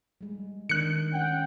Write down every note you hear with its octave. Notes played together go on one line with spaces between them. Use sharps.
G3 G#3
D#3 B3 D4 F#6 C#7
C#4 F#5 G5